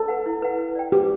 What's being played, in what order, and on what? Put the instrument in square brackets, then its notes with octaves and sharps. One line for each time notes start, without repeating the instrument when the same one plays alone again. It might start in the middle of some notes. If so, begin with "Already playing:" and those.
Already playing: [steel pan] A4
[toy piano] B4 F#5
E4
B4 F#5
B4
D5 G5
[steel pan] G4 [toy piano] B4